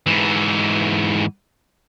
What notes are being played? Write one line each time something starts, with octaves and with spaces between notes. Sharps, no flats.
G#2 E3